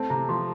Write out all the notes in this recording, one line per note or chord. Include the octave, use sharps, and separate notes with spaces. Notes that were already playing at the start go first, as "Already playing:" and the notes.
Already playing: A3 C4 A5
C3 A#5
F3 C6